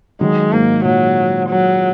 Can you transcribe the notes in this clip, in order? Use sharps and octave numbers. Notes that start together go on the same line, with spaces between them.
D#3 F#3 G#3
G#2 A#3
A#2 F#3
F#3